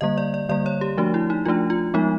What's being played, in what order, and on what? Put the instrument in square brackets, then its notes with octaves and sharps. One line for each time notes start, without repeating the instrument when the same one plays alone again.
[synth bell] D3 G3 A#3 D#5
D5
D5
D3 G3 A#3 D5
C#5
G4
F3 A3 D4 F#4
E4
D#4
F3 A3 D4 F4
F4
F3 G#3 B3 D#4